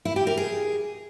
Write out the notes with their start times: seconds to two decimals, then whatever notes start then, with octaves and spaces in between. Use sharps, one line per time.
0.05 E4
0.16 G4
0.27 A#4
0.37 G#4